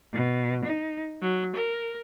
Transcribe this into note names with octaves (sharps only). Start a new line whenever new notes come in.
B2
D#4
F#3
A#4